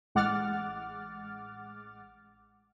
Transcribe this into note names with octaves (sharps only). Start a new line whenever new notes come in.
A1 G#3 F#5 D6 F6 A6